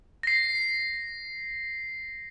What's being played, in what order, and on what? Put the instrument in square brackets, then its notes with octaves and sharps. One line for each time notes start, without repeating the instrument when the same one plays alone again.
[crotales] A#6 C7